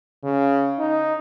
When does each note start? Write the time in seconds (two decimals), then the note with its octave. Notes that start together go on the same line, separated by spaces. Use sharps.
0.23 C#3
0.79 D#4